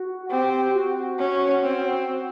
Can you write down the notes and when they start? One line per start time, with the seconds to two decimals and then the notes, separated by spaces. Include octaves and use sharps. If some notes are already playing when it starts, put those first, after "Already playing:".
Already playing: F#4
0.31 C4 G4
0.75 F#4
1.19 C#4
1.63 C4